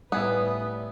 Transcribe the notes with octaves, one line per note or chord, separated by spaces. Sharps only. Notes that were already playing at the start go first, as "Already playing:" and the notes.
A2 G3 B3 B4 E5 G#5 D#6